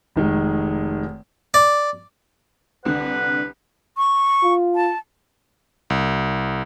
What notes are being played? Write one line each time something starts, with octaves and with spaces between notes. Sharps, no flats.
F1 D#3 G#3
D5
C2 D3 B4 F#5
C#6
F4
A5
C2